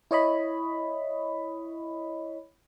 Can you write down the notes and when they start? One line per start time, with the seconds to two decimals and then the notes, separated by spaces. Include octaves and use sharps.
0.11 E4 C#5 D#5 B5